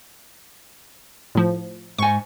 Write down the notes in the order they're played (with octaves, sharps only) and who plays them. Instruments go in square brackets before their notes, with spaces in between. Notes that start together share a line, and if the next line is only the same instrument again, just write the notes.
[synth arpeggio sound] A2 F3
[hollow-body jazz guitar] G#2 G#5 [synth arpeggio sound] C#6